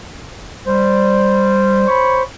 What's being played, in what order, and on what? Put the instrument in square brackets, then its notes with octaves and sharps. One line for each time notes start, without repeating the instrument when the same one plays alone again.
[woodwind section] G3 [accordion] C5
[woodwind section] C#5 B5 C#6